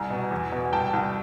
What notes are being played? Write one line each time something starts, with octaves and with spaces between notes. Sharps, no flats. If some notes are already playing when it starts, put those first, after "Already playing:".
Already playing: C2 G#5 A#5
B2
E2
B2
C2 G5 A5
C2